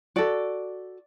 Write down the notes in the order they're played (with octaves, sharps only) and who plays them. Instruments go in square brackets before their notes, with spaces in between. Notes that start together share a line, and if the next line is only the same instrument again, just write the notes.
[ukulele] F#4 A4 D5